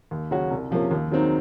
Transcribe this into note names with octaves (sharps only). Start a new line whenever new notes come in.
D#2
C#3 F#3 C#4 F#4
C2
C3 F3 A#3 C#4
D#2
D#3 F#3 C4 D#4